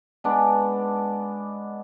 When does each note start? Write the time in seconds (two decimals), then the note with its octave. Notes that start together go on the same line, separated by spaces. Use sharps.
0.24 G#3 B3 D4